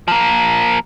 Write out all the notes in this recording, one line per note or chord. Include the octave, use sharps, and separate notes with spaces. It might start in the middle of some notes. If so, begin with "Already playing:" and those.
F3 A#3